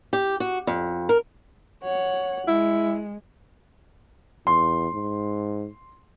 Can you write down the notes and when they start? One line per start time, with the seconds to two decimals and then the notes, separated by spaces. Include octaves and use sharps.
0.13 G4
0.40 F#4
0.67 F2
1.09 A#4
1.83 C#5 F#5
2.48 G#3 E4
4.47 E2 C6
4.93 G#2